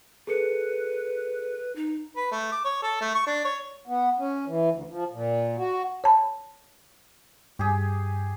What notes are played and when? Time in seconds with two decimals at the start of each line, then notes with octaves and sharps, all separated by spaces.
0.27 G#4 A4 B4 C#7
1.76 D#4
2.16 B4
2.32 A3
2.52 D6
2.64 C#5
2.82 A4
3.01 A3
3.15 C#6
3.26 D4
3.45 C#5
3.87 B3
4.19 C#4
4.47 E3
4.71 D2
4.89 F3
5.12 A#2
5.58 F#4
6.04 C#5 A5 B5
7.59 G2 G4 G#4